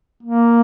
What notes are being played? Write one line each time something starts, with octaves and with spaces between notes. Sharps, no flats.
A#3